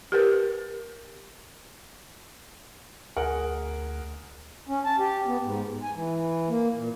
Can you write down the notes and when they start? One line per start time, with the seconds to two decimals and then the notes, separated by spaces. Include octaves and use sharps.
0.12 G4 A#4 B4
3.16 D2 G#4 A#4 F#5
4.69 C#4
4.85 A5
4.99 G4
5.26 B3
5.43 G#2
5.67 G#2
5.82 G#5
5.95 E3
6.49 A#3
6.76 A#2